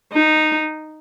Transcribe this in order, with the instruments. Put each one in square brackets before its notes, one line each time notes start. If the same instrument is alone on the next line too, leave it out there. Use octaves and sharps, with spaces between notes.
[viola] D#4